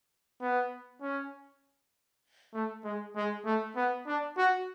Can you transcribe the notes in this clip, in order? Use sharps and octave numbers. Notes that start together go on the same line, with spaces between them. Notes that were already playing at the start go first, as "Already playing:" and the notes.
B3
C#4
A3
G#3
G#3
A3
B3
D4
F#4